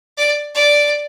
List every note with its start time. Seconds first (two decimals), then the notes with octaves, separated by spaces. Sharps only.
0.18 D5
0.55 D5